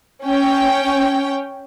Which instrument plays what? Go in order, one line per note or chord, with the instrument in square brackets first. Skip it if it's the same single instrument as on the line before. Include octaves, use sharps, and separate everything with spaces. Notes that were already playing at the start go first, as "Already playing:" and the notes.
[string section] C#4 G5